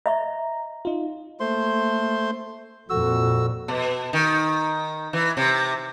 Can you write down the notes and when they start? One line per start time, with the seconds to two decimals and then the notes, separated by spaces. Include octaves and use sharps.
0.06 D#5 E5 A#5 C#6
0.85 D#4 F4
1.40 A3 A#3 C5 C6
2.90 F2 A#2 F#4 A4 E6
3.68 B2
4.13 D#3
5.13 E3
5.37 C3